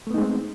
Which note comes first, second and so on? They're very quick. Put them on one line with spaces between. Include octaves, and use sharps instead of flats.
A3 B3 D#4 G#3 C4